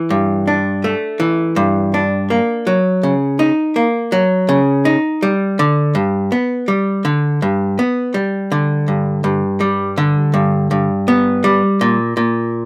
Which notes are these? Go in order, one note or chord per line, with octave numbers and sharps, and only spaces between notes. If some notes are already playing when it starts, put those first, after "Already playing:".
Already playing: E3
G2
D4
A3
E3
G2
D4
A#3
F#3
C#3
D#4
A#3
F#3
C#3
D#4
G3
D3
G2
B3
G3
D3
G2
B3
G3
D3
G2
G2
G3
D3
G2
G2
B3
G3
A#2
A#2